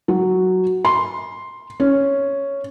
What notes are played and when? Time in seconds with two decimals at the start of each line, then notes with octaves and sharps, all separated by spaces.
0.08 F#3
0.85 C6
1.80 C#4